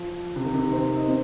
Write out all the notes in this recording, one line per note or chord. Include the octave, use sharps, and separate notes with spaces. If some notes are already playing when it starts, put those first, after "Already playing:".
Already playing: F3
C3
D#3
C3
D#3
C4
D#4
C4